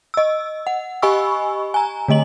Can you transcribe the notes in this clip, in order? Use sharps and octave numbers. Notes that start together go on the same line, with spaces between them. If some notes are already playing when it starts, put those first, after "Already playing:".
D#5 E6
F#5
G4 D#5 G#5 B5 C#6 E6
G#5 A#5
D3 A3 D#5 F#7